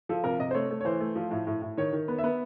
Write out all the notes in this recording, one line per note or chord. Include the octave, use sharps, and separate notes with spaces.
F3 A4
C3 A#4
C3 D#5
C5
A3 C#5
A3
C#5
E3 C5
A3
F3
A2
A2
A2
D#3 C#5
D#3
B3
E5
B3